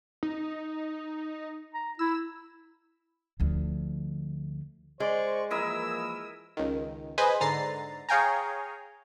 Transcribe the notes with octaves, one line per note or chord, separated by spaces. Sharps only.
D#4
A#5
E4 E6
D2 F3
G#3 C5 D5 C#6
E3 F3 A#3 E4 A#4 D#5 E6
C#2 D#3
G#4 B4 C5 D#5 G#5
G#2 D3 A#5 A6 C7
G#4 C#5 F5 G5 G#5 A#5